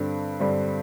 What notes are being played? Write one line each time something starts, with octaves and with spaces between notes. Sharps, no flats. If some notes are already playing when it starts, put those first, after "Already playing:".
Already playing: G2 D3 G3 C4
G2 D3 G3 C4